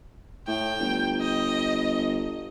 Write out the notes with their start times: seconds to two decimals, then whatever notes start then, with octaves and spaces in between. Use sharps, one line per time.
0.47 A2 G5
0.79 G1
1.21 D#5